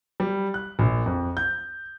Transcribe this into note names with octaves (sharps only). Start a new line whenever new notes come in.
G3
F#6
A#1
F2
G6